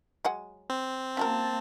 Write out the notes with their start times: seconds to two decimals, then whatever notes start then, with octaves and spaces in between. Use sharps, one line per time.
0.25 F#3 G#3 F#5
0.70 C4
1.17 A#3 C#4 F#4 A#4 A5